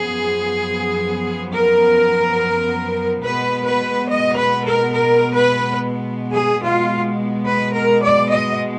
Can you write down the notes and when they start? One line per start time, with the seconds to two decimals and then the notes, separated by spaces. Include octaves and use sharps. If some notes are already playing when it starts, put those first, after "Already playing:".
Already playing: F#2 F3 B3 G#4
1.54 A#4
3.23 B2 G#3 B3 B4
3.66 B4
4.08 D#5
4.36 B4
4.64 A#4
4.93 A#4
5.35 B4
6.33 G#4
6.62 B2 G#3 B3 F4
7.46 B4
7.74 A#4
8.02 D5
8.31 D#5